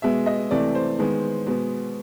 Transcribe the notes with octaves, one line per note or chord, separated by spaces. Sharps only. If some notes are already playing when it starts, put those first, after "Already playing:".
B2 G#3 B3 E5
D#5
C3 E3 A3 D5
C5
D#3 G#3 B3
B2 G#3 B3